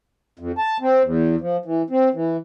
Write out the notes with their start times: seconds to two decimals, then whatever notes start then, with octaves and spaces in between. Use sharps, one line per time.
0.39 F2
0.58 A5
0.81 C4
1.04 E2
1.41 F3
1.65 E3
1.90 C4
2.14 E3